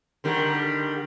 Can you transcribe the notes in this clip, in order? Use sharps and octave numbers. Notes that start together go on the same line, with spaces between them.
D3 D#3 G3